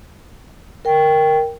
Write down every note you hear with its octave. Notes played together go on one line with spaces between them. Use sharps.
A#4 G5